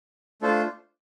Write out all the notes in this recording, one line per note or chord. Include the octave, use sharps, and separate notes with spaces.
A3 D4 F4 A4 C5